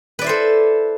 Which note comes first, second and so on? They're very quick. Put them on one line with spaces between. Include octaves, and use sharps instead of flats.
B4 D5 E4 C5 A4